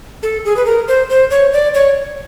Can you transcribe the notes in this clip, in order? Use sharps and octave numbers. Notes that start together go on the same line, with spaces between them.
A4
G#4
B4
A#4
C5
C5
C#5
D5
C#5